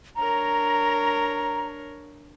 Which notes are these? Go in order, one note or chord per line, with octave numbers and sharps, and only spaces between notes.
D4 A#4 C#5 A#5